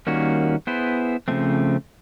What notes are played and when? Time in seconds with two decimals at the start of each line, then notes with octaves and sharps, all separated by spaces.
0.07 D#3 G3 A#3 C#4 F#4
0.67 B3 E4 G#4 C5
1.28 C#3 F3 A3 C4